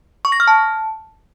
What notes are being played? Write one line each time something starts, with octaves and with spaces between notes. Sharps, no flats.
C#6
A#6
F6
A5